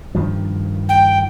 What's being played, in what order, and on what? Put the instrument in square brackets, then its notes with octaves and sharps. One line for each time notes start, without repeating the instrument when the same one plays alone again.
[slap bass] G2 D#3 F3
[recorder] G5